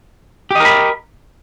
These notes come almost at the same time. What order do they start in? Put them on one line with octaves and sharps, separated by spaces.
G4 D#5 A#4 B5